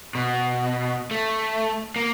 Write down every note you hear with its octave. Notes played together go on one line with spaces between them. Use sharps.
B2
A3
A#3